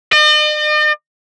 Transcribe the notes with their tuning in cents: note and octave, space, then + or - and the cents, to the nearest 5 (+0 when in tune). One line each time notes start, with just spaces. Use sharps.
D#5 -45